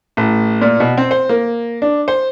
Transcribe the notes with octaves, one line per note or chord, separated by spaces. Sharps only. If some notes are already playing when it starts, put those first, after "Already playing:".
A1
A#2
B2
C4
C5
A#3
D4
C5